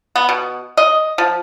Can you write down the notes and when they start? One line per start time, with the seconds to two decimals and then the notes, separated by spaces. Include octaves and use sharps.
0.16 B3
0.29 B2
0.77 D#5
1.18 F3